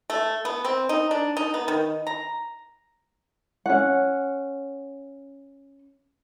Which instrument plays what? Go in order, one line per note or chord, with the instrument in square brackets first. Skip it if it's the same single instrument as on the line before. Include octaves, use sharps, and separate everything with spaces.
[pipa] A3
B3
C4
D#4
D4
D#4
B3
D#3
A#5
[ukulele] C#4 F#5